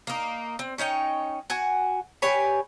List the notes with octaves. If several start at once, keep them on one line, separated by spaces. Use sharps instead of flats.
A#3 D#4
C4
C#4 D#4 C#5 G5
F#4 F#5 G#5
G4 B4 C#5 G#5